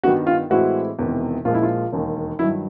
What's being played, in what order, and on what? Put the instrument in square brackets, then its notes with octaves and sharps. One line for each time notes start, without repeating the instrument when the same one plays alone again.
[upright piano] G2 D#3 G3 B3 D4 [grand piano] F#4
[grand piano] F4
[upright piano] A2 E3 G#3 C4 E4 [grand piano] F#4
[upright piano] E1 E2 C3 D#3
[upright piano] A#1 A#2 F3 G#3 [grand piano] F4
[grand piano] E4
F4
[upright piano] E1 D#2 D#3
[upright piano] G2 D#3 F#3 [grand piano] E4